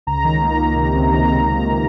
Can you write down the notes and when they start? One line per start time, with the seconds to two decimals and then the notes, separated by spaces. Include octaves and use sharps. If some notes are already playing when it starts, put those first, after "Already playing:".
0.07 C#2 A#5
0.25 D#3
0.42 A#3 A#5
0.59 D#3
0.76 C3
0.95 C#2
1.12 D#3 A#5